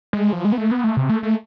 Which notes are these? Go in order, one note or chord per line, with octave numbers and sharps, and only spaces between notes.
G#3
F3
G#3
B3
A3
B3
A3
C3
A3
A3